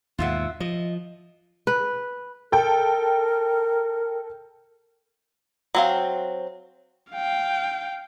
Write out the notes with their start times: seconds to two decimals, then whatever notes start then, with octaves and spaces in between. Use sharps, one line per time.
0.19 D#2 G#2 B2 F4 E5 F#5
0.60 F3 D#5
1.67 B4
2.52 A4 A#4 G5
5.75 F#3 C4 F5
7.11 F5 G5